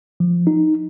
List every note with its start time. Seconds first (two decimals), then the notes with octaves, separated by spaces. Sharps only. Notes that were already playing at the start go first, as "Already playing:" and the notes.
0.20 F3
0.47 D#4